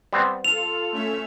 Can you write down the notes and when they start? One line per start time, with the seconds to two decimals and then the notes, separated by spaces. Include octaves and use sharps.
0.13 G3 B3 C4
0.44 F4 A4 F7
0.93 A3 C#4 E5